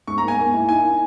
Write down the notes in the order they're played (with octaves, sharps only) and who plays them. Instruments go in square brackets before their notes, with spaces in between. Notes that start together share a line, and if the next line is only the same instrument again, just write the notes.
[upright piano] G#2 [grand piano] C#6
[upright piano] A#3 [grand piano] A#5
[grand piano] G#5
[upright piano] A#3
E4
[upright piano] D#4 [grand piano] G#5
[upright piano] D#4